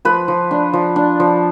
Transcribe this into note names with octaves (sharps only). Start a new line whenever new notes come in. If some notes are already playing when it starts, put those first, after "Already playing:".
F3 B4
F3
D4
F3
D4
F3